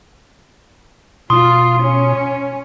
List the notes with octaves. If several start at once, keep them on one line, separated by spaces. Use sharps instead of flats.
B2 F4 C6 D#6
C#4